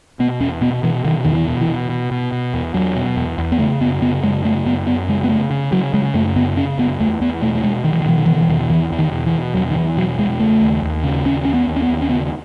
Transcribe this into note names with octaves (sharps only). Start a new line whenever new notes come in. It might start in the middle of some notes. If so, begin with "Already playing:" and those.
B2 B3
E2 C#4
B2 B3
B2 E3
B2 D#3
E2 D#3
E3
B2
E3
B2
B2
B2
B2
E2
E2 F#3
B2
E2
E2
B3
C#3 A3
F#2 B3
C#3 B3
F#2 G#3
C#3 A3
F#2 B3
F#2 B3
C#3 G#3
B3
C#3 A3
C#3
C#3 F#3
C#3 G#3
F#2 A3
C#3 B3
C#3 C#4
F#2 B3
E2 A3
E2 B3
B2 A3
A3
B2 G#3
B2 D#3
E3
D#3
B2 E3
D#3
B2 E3
D#3
E3
E2 D#3
E2 E3
E2
D#3
B2
E3
B2
E2 F#3
D#3
E2 E3
B2 F#3
E2 G#3
C#3 A3
D#2
D#2
C#3
D#2 C#4
D#2 C#4
B3
D#2
C#4
B3
D#2
C#4
C#3 B3